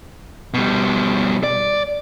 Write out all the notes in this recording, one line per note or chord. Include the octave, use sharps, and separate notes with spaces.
B2 G3
D5